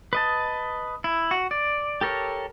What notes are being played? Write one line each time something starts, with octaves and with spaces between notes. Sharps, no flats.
B4 D#5 A5
E4
F#4
D5
G4 A4 A#4 C#5